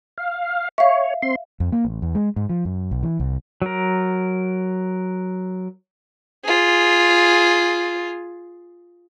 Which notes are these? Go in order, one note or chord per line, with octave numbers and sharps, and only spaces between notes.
F5
C#5 E5 F5
C4 C6
F2
A#3
A1
E2
G#3
G#2
F3
F#2
B1
E3
C2
F#3 A#4
F4 G#4